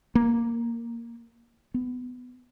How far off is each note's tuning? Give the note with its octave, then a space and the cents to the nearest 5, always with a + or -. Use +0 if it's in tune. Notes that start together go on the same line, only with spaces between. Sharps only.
A#3 +0
B3 +15